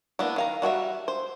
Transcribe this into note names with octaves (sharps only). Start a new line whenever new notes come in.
A#3 B3 D4 E4
D#3 F5 A#5
G3 F#4 A4 E5
C5